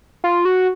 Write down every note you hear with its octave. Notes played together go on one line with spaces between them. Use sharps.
F4
F#4